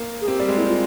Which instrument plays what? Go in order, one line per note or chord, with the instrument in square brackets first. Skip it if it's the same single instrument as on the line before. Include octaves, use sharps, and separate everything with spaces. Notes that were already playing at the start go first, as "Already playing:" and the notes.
Already playing: [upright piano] A#3
[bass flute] G#4
[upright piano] C4 [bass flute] G4
[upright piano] G3
G#3
[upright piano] A#3 [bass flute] E4
[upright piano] C4 [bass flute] F4